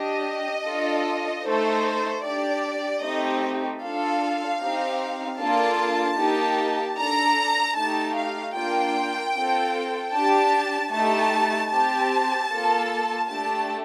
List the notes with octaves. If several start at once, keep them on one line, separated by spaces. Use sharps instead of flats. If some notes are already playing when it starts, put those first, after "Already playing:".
Already playing: D4 G4 D#5
D4 F4 A4
A3 D#4 A4 C5
D4 G4 D5
A3 C4 D#4 G4 D#5
D4 F4 A4 F5
C4 D#4 G4
A#3 D4 F4 A4 A5
A#3 D#4 G4
D4 A4 A#5
A3 D#4 G4 A5
F5
A#3 D4 F4 G5
C4 F4 A4
D4 G4 A5
A3 D#4 G4 A5
C4 G4 A5
A#3 F4 A4
A3 D4 G4 A5